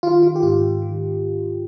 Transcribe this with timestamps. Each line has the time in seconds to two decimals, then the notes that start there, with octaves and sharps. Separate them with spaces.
0.03 D#3 F4
0.22 D#3 F4
0.36 G4
0.42 G#2 F4
0.62 G#2
0.82 D#3